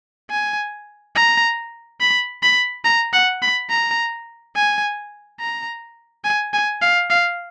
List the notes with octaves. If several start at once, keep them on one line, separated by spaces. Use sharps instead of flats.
G#5
A#5
B5
B5
A#5
F#5
B5
A#5
G#5
A#5
G#5
G#5
F5
F5